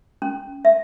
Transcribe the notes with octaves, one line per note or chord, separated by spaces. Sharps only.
C#4
E5